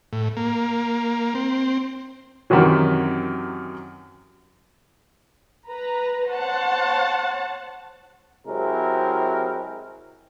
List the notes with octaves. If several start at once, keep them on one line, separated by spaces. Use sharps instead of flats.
A2
A#3
C4
F#2 C3 D#3 E3 F#3
B4 A#5
C5 C#5 F#5 A5
C3 F#3 G#3 C4 E4 A#4